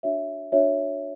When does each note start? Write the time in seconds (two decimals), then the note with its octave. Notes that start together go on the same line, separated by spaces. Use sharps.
0.03 D4 F#4 C#5 E5
0.52 D4 F#4 C#5 E5